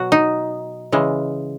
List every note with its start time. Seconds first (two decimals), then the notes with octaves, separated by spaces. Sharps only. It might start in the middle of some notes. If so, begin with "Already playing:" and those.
Already playing: B2 F#3 F#4
0.12 D#4
0.92 C#3 E3 G#3